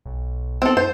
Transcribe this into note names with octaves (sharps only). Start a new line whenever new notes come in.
B1
B3 C4 A4
F#2 C5